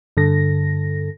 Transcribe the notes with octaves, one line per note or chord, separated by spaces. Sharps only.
G2 D3 A4 A#6